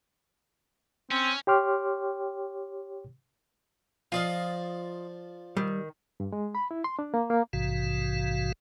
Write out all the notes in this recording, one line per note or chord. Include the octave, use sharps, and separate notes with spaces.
C4 C#4
G4 C#5 G5 C6 D6 F6
F3 F4 D5 D#5 F5
D#3 G3
G2
G#3
B5
E4
C6
D4
A#3
A#3
A#1 G#2 C3 E3 F#4 F5